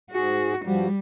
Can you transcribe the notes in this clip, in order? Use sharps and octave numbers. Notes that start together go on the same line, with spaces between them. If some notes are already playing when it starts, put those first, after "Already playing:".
G#2 F#4 G#4
G2 F3 G3 F#4